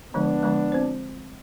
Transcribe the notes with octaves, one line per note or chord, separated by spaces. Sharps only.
D3 F3 G#3 B3 D4
D3 F3 G#3
C4 F4 C5